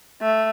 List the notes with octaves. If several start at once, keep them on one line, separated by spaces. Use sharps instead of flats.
A3